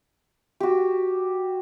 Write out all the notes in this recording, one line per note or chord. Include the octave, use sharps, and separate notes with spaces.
F#4 G4